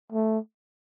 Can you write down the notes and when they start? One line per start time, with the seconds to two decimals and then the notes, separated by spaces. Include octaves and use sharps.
0.12 A3